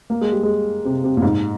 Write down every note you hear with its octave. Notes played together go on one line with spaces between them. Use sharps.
A#3
G#3
G3
G#3
C3
C3
A#2
G#2